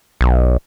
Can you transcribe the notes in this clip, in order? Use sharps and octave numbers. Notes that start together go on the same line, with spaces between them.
B1